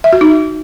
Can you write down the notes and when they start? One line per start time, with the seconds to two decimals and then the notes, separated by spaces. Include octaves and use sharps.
0.04 E5
0.13 F#4
0.21 D#4